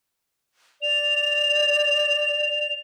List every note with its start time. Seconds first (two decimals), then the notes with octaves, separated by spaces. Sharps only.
0.82 D5 F7